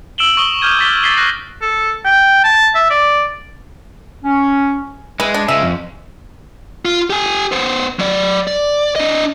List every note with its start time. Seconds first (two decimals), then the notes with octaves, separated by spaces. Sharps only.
0.18 E6 D7 E7 F#7 G7
0.37 C#6 D#6 G7
0.61 D6 F6 G6 G#6 D#7
0.79 C#6 D6 A6 B6 G7
1.03 A6 B6 C7 G7
1.17 C#6 F#6 A#6 C7
1.62 A4
2.05 G5
2.44 A5
2.75 E5
2.90 D5
4.23 C#4
5.20 E3 G#3
5.34 D4
5.48 C#3 G#3 E5
5.62 F2
6.85 F4
7.10 G4 G#5
7.52 B3 C5
7.99 F#3 D5
8.47 D5
8.96 D4 D#5